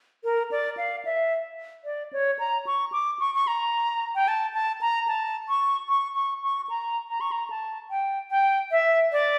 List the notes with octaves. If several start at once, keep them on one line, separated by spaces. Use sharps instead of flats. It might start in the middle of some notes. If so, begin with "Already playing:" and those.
A#4
D5
F5
E5
D5
C#5
A#5
C#6
D6
C#6
C#6
A#5
G5
A5
A5
A#5
A5
C#6
C#6
C#6
C#6
A#5
A#5
C#6
A#5
A5
G5
G5
E5
D5